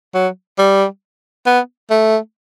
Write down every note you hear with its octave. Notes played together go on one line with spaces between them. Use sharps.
F#3
G3
B3
A3